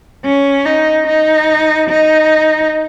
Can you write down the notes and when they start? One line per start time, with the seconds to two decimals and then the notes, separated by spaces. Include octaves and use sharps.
0.25 C#4
0.66 D#4
1.07 D#4
1.90 D#4